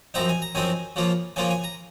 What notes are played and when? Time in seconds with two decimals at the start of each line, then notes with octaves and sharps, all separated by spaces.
0.14 F#2 F3 C4 D#4 A#5
0.29 G#5
0.42 A#5
0.55 F#2 F3 C4 D#4 G#5
0.96 C#3 F3 A#3 F4
1.36 C#3 F3 A#3 F4 G#5
1.50 G#5
1.64 A#5